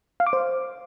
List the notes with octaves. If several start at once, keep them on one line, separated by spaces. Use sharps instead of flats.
F5
D6
C5